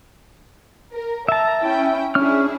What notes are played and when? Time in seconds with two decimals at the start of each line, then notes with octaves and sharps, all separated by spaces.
0.94 A#4
1.28 E5 A5 A#5
1.62 C#4 E4 G5
2.15 C#4 D4 E4 G#4 F6